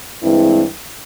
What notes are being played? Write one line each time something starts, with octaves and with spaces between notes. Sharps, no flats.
G2 E3 G#3 C4 E4